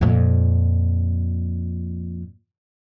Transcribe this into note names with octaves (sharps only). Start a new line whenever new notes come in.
F2 A#2